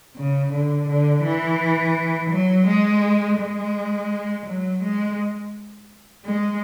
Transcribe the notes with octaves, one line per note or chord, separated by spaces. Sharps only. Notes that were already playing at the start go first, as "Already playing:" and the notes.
C#3
D3
D3
E3
F#3
G#3
G#3
F#3
G#3
G#3